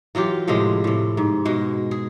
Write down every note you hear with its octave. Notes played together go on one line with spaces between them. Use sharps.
E3 F#3 F4 G4
A2 C3 F3 G#3
A2 C3
G#2
B2 G#3
G#4